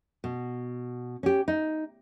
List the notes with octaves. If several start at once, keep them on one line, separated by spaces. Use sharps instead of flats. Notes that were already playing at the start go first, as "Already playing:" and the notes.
B2
C#4 G4
D#4